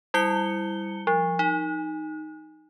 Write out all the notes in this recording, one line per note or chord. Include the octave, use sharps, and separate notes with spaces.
G3 E4 C#7 G7
F3
D#4